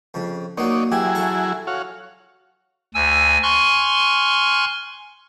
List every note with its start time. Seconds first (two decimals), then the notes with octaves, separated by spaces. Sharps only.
0.14 F2 C#3
0.58 F#3 A#3 D#4 C#5 D5
0.92 F#3 E4 G4 G#4
1.15 A4 C#6
1.67 F#4 C#5 F5
2.94 D2 G#5 E6
3.43 G#5 C6 C#6 F6 F#6